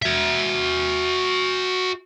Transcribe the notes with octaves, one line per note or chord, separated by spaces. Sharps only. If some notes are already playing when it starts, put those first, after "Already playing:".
F#4 E5